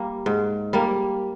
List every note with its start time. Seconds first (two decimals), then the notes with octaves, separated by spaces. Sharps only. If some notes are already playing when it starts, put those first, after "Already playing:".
Already playing: G3 A#3
0.26 G#2
0.73 G3 A#3